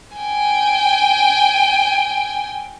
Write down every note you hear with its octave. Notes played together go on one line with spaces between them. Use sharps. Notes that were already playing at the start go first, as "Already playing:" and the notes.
G5 G#5